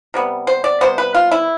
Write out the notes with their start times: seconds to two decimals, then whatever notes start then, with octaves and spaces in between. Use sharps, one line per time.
0.14 C3 G3 B3
0.47 C5
0.64 D5
0.81 C3 G3 B3 C5
0.98 B4
1.14 F4
1.31 E4